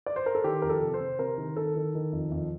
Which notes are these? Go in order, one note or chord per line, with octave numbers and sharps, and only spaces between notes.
D5
C5
A#4
A4
D#3 G4
F2 A#4
A4
C3
C5
C3
C3 A#4
D#3
D#3 A4
D#3
D#3
F2
F2